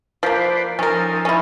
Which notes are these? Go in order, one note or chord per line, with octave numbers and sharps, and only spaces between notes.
F3 A#3 B4 C5 D5
F3 C#4 D#4 A4 A#4
C#4 E4